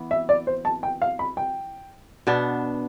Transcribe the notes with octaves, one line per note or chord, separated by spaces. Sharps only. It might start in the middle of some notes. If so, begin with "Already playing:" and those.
Already playing: E3 B3
E5
D5
C5
A5
G5
F5
B5
G5
B2 B3 D4